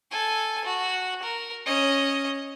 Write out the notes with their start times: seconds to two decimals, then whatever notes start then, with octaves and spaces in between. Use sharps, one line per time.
0.11 A4 G#5
0.64 F#4
1.23 A#4
1.66 C#4 D#5